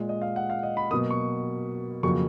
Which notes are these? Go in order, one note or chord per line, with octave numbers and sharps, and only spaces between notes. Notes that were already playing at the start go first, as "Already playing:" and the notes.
Already playing: A#2 G#3
D#5
F5
F#5
F5
D#5
B5
B2 F#3 A#3 D#6
C#6
F2 C#3 F#3 A#3 C#6